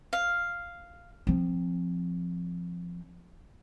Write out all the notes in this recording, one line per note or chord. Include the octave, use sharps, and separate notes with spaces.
F5
F3 C4